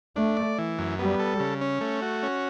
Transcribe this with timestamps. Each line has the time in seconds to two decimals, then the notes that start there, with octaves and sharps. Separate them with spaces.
0.16 A3 D4
0.37 D5
0.58 E3
0.78 F#2
0.99 G3 B3
1.19 A4
1.40 C#3
1.61 C#4
1.81 A3
2.02 F#4
2.23 C#4